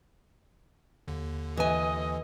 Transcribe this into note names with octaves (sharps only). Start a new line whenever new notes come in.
D#2 D3
E3 D#5 G#5